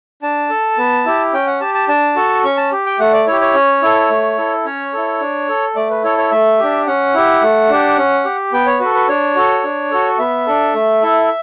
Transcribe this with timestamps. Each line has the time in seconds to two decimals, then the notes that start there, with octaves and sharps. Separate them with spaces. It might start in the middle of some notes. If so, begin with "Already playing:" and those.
0.22 D4 A5
0.50 A4
0.78 B3
1.06 E4 G4
1.33 C#4 G5
1.47 F#5
1.61 G4 A5
1.74 A5
1.88 D4 A5
2.16 F#4 A4
2.44 C#4 C#6
2.57 A5
2.72 G4
2.86 G5
2.99 A3 F#5
3.13 D5
3.27 E4 G4 C#5
3.41 C#5
3.54 C#4
3.82 E4 A4
4.10 A3
4.38 E4 A4
4.65 C#4 C#5
4.93 E4 A4
5.20 D4
5.49 A4
5.76 A3 D5
5.90 B4
6.04 E4 A4 C#5
6.18 C#5
6.31 A3 E5
6.59 D4 G4
6.87 C#4 F#5
7.15 E4 G4
7.43 A3
7.70 D4 G4
7.97 C#4
8.25 G4
8.53 B3 G5
8.66 C#5
8.80 F#4 A4 B4
8.95 B4
9.08 D4 C#5
9.36 F#4 A4
9.64 D4
9.91 F#4 A4
10.19 B3 E5
10.47 D4 A4
10.74 A3
11.02 E4 A4